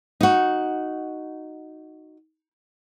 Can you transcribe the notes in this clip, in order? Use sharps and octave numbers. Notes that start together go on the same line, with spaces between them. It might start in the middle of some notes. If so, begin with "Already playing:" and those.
D#4 F#4